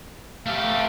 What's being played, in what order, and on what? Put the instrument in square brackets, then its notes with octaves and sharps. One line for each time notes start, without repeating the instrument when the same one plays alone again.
[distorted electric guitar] A3 G4 [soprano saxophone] F5